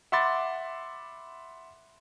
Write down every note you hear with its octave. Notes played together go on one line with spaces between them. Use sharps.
E5 F#5 B5 C6 D6 A6